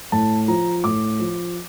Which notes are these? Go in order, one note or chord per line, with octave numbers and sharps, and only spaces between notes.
A2 A5
F3 A#5
A2 D6
F3